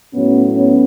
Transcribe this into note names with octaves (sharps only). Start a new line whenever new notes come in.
A2 F#3 B3 C#4
B3 C#4